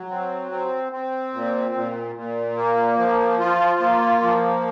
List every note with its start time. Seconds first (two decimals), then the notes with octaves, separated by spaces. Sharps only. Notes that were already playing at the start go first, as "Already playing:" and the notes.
Already playing: F#3
0.10 C4
0.52 C4
0.92 C4
1.34 A#2
1.75 A#2
2.16 A#2
2.56 A#3
2.98 F3
3.39 F4
3.80 A#3
4.22 F3